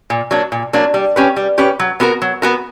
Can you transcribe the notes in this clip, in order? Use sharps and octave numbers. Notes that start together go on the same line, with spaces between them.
A#2
F#3 A#3 D4
A#2
F#3 A#3 D4
G3
C#4 G4 B4
G3
C#4 G4 B4
F#3
B3 F#4 A#4
F#3
B3 F#4 A#4